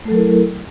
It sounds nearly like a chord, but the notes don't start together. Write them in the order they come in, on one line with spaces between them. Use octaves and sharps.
A3 A4 F#3 A#4 E4